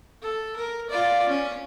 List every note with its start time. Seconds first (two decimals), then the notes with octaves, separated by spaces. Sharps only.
0.22 A4
0.57 A#4
0.90 F4 D5
1.29 C#4